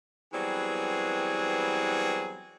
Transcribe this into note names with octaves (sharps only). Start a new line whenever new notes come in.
E3 F#3 G3 B3 C4 G#4